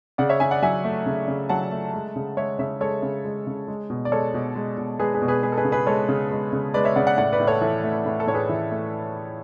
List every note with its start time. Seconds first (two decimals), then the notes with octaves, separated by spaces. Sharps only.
0.18 C#3 D5 F#5
0.29 C#5 E5
0.40 C#3 E5 G#5
0.51 D5 F#5
0.62 F#3 E5 G#5
0.84 A3
1.06 C#3
1.28 C#3
1.49 F#3 F#5 A5
1.71 A3
1.93 G#3
2.16 C#3
2.37 G#3 C#5 E5
2.59 C#3 C#5 E5
2.80 G#3 A4 C#5
3.02 C#3
3.25 G#3
3.47 C#3
3.68 G#3
3.90 B2
4.05 D5
4.12 G#3 A4 C#5
4.34 B2
4.55 G#3
4.77 B2
4.99 G#3 G#4 B4
5.14 G#4 B4
5.22 B2
5.28 G#4 B4
5.43 G#3 G#4 B4
5.52 A4
5.57 G#4 B4
5.65 C#3
5.72 G#4 B4
5.87 G#3 A4 C#5
6.08 C#3
6.31 G#3
6.52 C#3
6.74 G#3 B4 D5
6.85 C#5 E5
6.96 C#3 D5 F#5
7.07 D5 F#5
7.18 A2 D5 F#5
7.33 B4 D5
7.40 A2
7.47 A4 C#5
7.61 E3 A4
7.84 A3
8.06 A2
8.20 A4
8.27 A2 C#5
8.34 G#4 B4
8.49 E3
8.71 A3